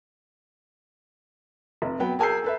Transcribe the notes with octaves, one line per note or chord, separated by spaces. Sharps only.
F1
F#3 B3 B4 F#5 G5
G#4 A#4 G#5 E6 G6 C7
A4 B4 E5